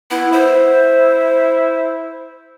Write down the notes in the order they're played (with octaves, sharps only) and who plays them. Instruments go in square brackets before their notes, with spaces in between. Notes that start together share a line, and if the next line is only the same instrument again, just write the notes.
[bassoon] B3 [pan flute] E4
[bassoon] E4 [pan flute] C5